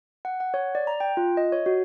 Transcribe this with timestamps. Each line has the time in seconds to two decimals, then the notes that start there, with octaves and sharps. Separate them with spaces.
0.25 F#5
0.40 F#5
0.54 C#5
0.75 D5
0.87 A#5
1.00 G5
1.17 F4
1.37 D#5
1.52 C#5
1.66 F#4